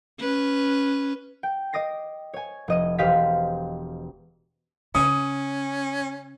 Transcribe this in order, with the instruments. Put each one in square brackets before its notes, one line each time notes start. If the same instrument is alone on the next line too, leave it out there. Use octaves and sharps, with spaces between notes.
[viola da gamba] C#4 B4
[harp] G5
D#5 D6 D#6 A#6 C7
C#5 G#5
F1 D#5 D#7
E1 G4 C5 D#5 F5 B6
[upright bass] C#3 [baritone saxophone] C#4 [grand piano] D#6